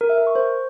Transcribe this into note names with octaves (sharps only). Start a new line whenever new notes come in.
A#4
E5
A#4
C#6
C5